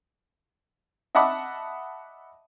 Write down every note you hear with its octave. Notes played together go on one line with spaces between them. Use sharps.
D#5 E5 F#5 A5 B5 D6